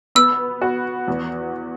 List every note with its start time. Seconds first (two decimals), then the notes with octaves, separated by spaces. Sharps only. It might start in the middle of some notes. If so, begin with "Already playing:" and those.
0.15 B3 E6
0.61 F#4
1.08 E2